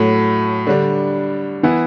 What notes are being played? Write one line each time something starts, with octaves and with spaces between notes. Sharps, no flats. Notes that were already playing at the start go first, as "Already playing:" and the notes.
Already playing: A2 F#3 A3
D3 G3 D4
E3 B3 E4